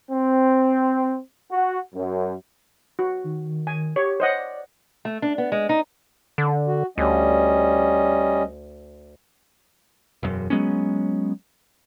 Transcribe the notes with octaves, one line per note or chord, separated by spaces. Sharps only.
C4
F#4
F#2
F#4
D#3
G#5
G4 C#5
C5 C#5 D#5 F#5
D5
A3
D4
B3
G#3
D#4
D3
F#4
D2 G3 C#4 D#5
E1 F#2
F#3 G#3 B3 C#4